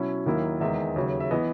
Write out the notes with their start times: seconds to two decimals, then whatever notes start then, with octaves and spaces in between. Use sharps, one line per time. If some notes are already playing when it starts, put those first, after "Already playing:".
Already playing: B2 F#3 C#4 E4
0.26 D#2 D#3 F#3 A#3 E4
0.60 E2 D#3 G#3 E5
0.96 D#2 C#3 F#3
1.20 E5
1.31 E3 B3 D#5